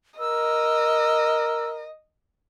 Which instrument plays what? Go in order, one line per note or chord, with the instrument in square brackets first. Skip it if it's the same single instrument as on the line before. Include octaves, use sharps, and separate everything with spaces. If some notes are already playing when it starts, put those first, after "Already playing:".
[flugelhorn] A#4 [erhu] D#5 [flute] E6